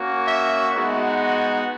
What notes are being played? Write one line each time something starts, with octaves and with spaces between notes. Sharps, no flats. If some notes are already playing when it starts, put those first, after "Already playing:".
Already playing: A#3 C#4 F#4
E5
G#3 B3 D#4 F#4